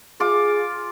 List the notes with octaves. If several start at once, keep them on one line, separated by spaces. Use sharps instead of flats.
F4 G#4 D6